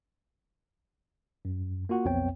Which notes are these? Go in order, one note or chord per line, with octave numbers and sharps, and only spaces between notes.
F#2
A#3 F4 F#4 F#5
B1 F2 B3 C4 C#5 G5